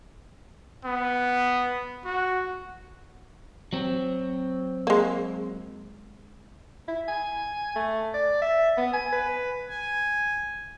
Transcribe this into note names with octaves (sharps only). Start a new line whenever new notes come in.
B3
F#4
F#3 C4
G#3 A#3
E4
G#5
A3
D5
E5
B3
G#5
B4
G#5